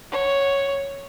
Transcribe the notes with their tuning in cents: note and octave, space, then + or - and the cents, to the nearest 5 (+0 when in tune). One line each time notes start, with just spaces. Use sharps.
C#5 +0 F#5 +0